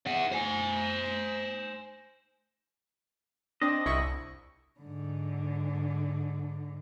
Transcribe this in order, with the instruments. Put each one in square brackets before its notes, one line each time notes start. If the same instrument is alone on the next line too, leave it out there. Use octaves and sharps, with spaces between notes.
[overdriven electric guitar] E4 F#5
C5 G#5
[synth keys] C4 D4 [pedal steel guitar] D#5
[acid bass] C2 [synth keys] E4 C#6
[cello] G#2 D3